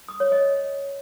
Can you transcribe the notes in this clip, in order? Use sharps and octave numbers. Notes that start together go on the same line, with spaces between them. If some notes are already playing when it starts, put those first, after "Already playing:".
D#6
C#5
D#5